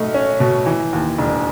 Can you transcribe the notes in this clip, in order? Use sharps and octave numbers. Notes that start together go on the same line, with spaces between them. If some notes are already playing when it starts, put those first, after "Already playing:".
Already playing: B1 A3 D#5
C#4
B2
E3
D#2
E1